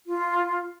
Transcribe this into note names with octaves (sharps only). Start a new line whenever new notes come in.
F4